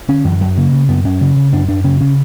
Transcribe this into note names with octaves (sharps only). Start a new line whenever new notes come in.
D3 C#4
F#2 E3
F#2 F#3
C#3 A#3
C#3
F#2 B3
F#2 C#4
C#3
C#3
F#2 D4
F#2 D4
C#3 C#4
C#3 C#4